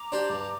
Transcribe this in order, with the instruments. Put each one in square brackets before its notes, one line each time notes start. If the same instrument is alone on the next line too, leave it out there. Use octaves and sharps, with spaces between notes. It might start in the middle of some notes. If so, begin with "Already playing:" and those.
Already playing: [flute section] A#5 D6
[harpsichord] D4 G4 C5
G2